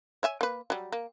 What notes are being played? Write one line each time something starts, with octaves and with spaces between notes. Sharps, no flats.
C#5 E5 G#5
A#3 B4
F#3 G3
A#3